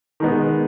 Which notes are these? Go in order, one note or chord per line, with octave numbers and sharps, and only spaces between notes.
D#3 G#3 B3